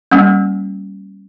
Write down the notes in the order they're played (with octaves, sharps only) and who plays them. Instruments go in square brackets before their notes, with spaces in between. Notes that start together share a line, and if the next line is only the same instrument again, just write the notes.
[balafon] G3 A#3 C#4